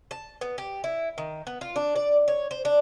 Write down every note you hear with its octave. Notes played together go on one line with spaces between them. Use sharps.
A5
B3
G4
E4
D#3
B3
F4
D4
D5
C#5
C5
D4